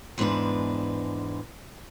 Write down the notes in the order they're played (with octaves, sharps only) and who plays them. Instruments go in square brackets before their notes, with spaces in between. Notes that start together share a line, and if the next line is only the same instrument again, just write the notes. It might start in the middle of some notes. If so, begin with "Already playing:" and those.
[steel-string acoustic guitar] E2 G#2 G#3 D4 B4